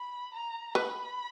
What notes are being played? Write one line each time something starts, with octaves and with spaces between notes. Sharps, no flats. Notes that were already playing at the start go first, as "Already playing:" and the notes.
Already playing: B5
A#5
B4 B5